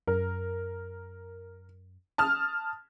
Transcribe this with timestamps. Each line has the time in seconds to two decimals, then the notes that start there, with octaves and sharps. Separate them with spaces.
0.07 F#2 A#4
2.18 A5 D#6 F6